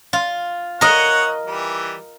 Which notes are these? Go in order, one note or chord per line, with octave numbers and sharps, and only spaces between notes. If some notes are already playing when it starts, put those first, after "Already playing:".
F4
A#4 C#5 D#5 F#5
E3 G3